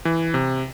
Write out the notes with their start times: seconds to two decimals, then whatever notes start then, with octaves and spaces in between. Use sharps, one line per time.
0.05 E3
0.34 C3